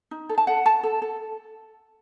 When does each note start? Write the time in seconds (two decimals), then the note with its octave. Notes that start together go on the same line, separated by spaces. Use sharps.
0.11 D#4
0.29 A4
0.38 A5
0.47 A4 F#5
0.66 A4 A5
0.83 A4
1.02 A4